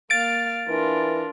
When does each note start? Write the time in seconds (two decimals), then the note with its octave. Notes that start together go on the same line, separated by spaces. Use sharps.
0.10 A#3 F5 A6 D7
0.68 E3 D4 F4 A#4